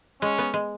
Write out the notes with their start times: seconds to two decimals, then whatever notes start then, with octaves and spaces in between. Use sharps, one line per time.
0.22 G#3 C#4
0.38 B3
0.54 G#3